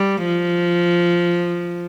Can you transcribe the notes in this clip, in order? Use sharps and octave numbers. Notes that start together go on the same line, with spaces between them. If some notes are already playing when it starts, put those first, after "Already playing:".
Already playing: G3
F3